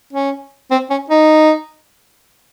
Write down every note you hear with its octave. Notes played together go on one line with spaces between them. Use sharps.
C#4
C4
C#4
D#4